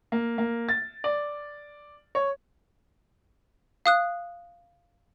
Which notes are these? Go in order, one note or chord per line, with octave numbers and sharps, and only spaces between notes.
A#3
A#3
A6
D5
C#5
F5 D#6 F#6